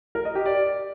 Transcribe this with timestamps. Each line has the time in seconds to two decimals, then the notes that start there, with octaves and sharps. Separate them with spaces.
0.15 A#4
0.25 D#5
0.35 G4
0.46 D5